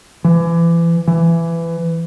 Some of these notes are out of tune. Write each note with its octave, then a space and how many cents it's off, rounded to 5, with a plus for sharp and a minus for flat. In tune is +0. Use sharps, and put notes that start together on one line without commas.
E3 +35
E3 +20